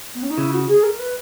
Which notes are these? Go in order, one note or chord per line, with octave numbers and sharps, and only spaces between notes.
B3
C#4
D#4
C#3 E4
F#4
G#4
A#4
B4